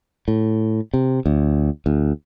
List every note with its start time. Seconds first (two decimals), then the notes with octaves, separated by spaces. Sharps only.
0.28 A2
0.94 C3
1.26 D2
1.86 D2